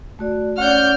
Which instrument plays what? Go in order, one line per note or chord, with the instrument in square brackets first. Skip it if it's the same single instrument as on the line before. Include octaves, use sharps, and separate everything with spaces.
[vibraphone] A3 F#4 D5
[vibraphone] C#4 [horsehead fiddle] C#5 D5 [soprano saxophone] F#5 [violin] F6 G6